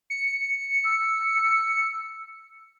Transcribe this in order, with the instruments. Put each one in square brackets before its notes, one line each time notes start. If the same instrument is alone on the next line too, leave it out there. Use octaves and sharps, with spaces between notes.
[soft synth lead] C#7
[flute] E6